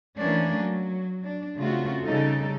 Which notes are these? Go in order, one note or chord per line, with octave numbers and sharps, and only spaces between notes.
E3 A3 A#3 C#4 D4
F#3
D4
C#3 A3 C4 F4 F#4
C#3 G3 D#4 A4